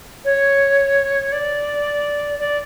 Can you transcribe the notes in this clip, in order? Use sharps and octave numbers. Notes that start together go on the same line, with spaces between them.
C#5
D5
D5